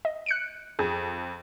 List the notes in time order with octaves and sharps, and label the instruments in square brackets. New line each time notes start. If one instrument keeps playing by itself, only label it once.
[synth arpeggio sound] D#5
F#6 C#7 D7
[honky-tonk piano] F2 [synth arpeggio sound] G#4